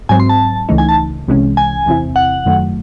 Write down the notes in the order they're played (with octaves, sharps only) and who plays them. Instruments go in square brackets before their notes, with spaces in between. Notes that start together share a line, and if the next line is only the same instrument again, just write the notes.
[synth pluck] G#2 F#3 C4 [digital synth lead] G#5
[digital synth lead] C6
A5
[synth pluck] C#2 C#3 E3 A3 D#4
[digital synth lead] G#5
A5
[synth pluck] C2 C3 E3 G#3 C#4
[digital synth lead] G#5
[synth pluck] E2 C3 E3 C4 E4
[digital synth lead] F#5
[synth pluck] F#2 D#3 F#3 A3